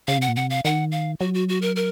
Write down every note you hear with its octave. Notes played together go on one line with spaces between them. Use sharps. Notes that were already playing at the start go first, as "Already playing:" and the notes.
C#3 F5
C3 F#5
A#2
C3 F#5
F5
D#3 F#5
F5
F#3 F#4
F#4
F#4
A#4
A#4